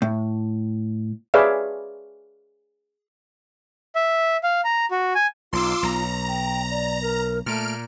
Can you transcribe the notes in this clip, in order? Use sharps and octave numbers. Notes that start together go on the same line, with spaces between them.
A2
G#4 B4 C#5 D5 E5 F5
E5
F5
A#5
F#4
G#5
B1 F4 C6 D6 E6
B1 A#5
G5
D5
A#4
A#2 A3 F6 D7